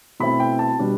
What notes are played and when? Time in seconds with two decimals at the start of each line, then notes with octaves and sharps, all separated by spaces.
0.20 B2 A3 C4 E4 B5
0.40 G5
0.59 A5
0.79 B2 G3 D4